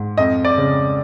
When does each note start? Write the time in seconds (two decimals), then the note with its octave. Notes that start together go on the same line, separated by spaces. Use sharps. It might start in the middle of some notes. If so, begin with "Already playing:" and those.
Already playing: G#2
0.18 F2 D#5
0.45 D5
0.58 C#3